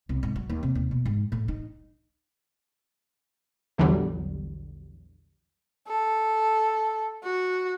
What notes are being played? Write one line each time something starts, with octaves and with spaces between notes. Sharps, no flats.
C2
G#2
F#3
D#2
C3
D#2
B2
G#2
A2
D#4
A#1 E2 D3 E3 F#3 G3
A4
F#4